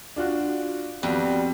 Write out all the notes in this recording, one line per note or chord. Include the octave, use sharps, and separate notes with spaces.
D4 F4 F#4
F2 G3 B3 F#4